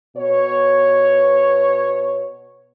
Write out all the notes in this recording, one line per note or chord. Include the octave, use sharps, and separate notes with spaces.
B2 C#5